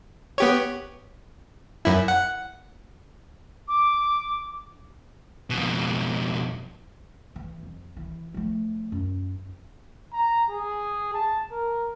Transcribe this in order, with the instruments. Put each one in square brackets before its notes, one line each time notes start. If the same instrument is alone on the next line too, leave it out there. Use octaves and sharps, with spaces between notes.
[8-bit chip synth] B3 G4 C#5
F#2 E4
F#5
[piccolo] D6
[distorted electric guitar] F2 B2
[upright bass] E3
F2
E3
F3 A3
F#2
[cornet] A#5
G#4
A5
A#4